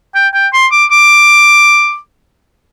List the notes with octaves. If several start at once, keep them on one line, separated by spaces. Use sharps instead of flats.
G5
G5
C6
D6
D6